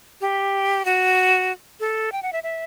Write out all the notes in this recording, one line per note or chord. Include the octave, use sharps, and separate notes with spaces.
G4
F#4
A4
G5
F#5
E5
E5